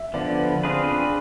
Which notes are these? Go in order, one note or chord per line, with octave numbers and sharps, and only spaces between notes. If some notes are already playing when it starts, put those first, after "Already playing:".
Already playing: E5
D3 F3 B3 D5
B4
C4 D4 F4 G#4 B4
D4